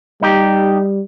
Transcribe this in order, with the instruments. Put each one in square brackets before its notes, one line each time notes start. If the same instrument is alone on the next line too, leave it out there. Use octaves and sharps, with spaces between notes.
[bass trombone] G3 [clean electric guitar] D#4 G4